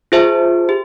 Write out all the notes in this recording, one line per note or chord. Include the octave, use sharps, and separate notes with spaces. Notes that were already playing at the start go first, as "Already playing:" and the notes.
F4 G#4 C5 E5 A5
G4